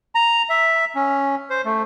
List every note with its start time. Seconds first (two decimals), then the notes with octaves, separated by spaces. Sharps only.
0.15 A#5
0.49 E5
0.95 C#4
1.50 C5
1.65 A3